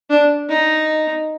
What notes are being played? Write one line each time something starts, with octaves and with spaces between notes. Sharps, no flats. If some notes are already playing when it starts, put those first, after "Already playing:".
D4
D#4